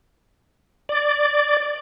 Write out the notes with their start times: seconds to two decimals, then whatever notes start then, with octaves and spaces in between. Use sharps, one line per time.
0.89 D5